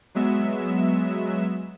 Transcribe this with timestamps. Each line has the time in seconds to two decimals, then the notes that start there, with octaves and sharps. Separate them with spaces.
0.15 F#3 G#3 B3 E5 E7